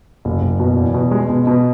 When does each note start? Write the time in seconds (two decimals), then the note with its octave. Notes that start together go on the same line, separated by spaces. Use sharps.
0.25 F#1
0.41 F#1
0.59 B2
0.76 E2
0.94 B2
1.11 G#3
1.29 B2
1.47 B2